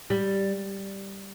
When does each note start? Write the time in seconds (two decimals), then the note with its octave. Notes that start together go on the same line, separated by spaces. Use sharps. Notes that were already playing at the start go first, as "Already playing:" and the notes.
0.10 G3